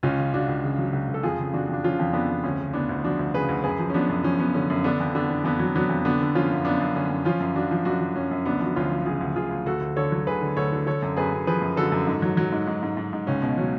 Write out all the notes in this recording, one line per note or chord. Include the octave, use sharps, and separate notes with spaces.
C#2 C#4 F4
C#3
C#2 D4 F#4
C#2
C#3
F#3
C#2
C#2
A4
F2 F4 G#4
C#3
F2 D4 F#4
F2 D4
F3 C#4 F4
F2
F2 B3 D4
F2
D2 C#4
C#3
D2 B3 D4
D2
F3 D4 F#4
D2
C#3 G#4 B4
D2
F#2 G#4 B4
F3
C#4
F3 B3 D4
F#2
F3 C#4
F3 B3
D3 C#4
F#2
D3 B3 D4
F2
D3 B3 D4
D3
F2 B3 D4
F#3
F#3 B3 D4
F2
D3 B3 D4
D3
F3 C#4 F4
F#2
F#2 B3 D4
F#2
D3 C#4
F#2
F3 C#4 F4
F#2
F3 D4 F#4
F3
F#2 D4 F#4
F3
F#2 C#4
F#2
D2 B3 D4
F3 F#4
D2 C#4 F4
F3
C#3 F4 G#4
D2
D2 F4 G#4
D2
D2 F#4 A4
D2
D3 A4 C#5
F#3
D2 G#4 B4
D3
D2 A4 C#5
D3
D3 A4 C#5
F#2
F#2 G#4 B4
F#2
F3 G#4 B4
F#2
D3 F#4 A4
F#2
G#2
F#3
F#3
G#2
G#2
G#2
G#2
G#2
C#2 C#4
B2
F#3 C#4